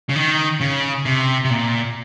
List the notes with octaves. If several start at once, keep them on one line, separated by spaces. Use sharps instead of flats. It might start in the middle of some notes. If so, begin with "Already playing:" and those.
C#3
D#3
C#3
C3
C3
A#2